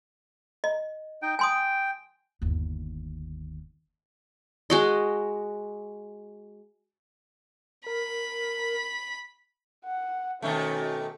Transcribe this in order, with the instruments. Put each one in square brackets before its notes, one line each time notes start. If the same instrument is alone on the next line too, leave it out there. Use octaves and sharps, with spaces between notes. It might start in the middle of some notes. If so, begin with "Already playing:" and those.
[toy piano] D#5
[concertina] D#4 G5
[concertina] G5 [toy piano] G#5 C6 D#6
[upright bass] G1 D#2
[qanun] G#3 F#4 D#5
[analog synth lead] A#4 [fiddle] B5
[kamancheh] F#5
[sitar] B2 D#3 A3 [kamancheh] C#4